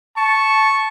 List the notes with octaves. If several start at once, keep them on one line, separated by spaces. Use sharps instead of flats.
A5 C#6